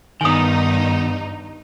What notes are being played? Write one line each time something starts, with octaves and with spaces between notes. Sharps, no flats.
G2 D#3 B3 D#4 G#5 D#6